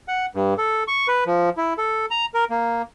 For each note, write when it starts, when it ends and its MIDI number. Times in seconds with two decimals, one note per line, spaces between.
0.08 0.26 78
0.35 0.54 43
0.58 0.83 69
0.88 1.07 85
1.08 1.24 71
1.26 1.50 53
1.57 1.74 64
1.78 2.06 69
2.11 2.25 82
2.34 2.44 70
2.50 2.82 58